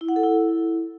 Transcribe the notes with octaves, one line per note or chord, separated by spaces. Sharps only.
E4
F#5
A4
E4